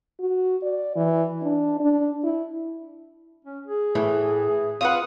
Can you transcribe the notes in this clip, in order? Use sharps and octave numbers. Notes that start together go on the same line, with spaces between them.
F#4
D5
E3
D4
D4
E4
C#4
G#4
A2 E3
C4 F4 F#4 B4 F#5 D#6